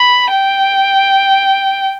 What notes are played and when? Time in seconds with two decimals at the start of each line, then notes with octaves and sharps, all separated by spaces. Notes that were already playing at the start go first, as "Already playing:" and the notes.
Already playing: B5
0.31 G5